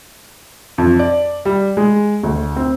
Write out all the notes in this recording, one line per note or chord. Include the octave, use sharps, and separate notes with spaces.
F2
D5
G3
G#3
D2
C4